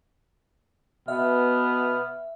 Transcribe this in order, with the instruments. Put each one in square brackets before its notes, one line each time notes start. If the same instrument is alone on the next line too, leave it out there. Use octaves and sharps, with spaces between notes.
[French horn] B2 [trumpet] B3 [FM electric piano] E5 [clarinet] F6